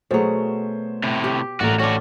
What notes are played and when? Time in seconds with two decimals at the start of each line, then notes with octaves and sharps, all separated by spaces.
0.11 B2 F#3 A3 G#4 C5
1.03 A2 C3
1.24 G4
1.60 A1 A3 F#4 A#4 D5
1.80 A2 C#4 D4 F#4